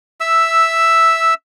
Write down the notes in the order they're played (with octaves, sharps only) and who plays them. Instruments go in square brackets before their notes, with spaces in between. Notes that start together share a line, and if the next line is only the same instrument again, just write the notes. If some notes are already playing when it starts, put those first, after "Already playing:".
[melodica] E5 E6